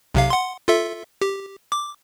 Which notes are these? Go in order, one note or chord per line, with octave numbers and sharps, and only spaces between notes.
B1 C3 F5
F#5 C6
F4 A4 E5
G4
D6